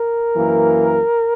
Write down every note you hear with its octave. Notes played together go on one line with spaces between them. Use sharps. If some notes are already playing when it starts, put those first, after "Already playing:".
Already playing: A#4
F#2 E3 A#3